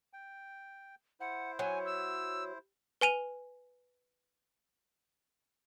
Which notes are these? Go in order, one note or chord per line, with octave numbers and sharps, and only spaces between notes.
G5
E4 C5 F#5
F#3 G#5
E6
B4 G#5 D#7 F7